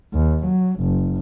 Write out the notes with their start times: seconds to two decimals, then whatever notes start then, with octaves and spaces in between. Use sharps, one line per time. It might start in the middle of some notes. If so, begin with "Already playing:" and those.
0.14 D#2
0.45 F#3
0.80 F#1